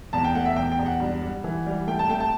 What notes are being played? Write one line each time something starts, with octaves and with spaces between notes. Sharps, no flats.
E2 A5
G5
A3 F#5
E5
E2 G5
G5
E2
F#5
G2
G3
E3
G3
A3 G5
A5
A3 G5
A5